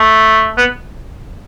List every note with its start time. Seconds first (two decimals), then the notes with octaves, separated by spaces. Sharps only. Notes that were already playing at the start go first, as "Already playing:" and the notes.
Already playing: A3
0.58 B3